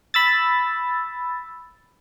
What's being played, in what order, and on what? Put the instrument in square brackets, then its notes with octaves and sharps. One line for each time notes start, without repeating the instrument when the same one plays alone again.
[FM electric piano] B5 E6 A6